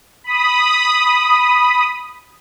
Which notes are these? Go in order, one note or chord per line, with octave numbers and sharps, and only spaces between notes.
B5 D#6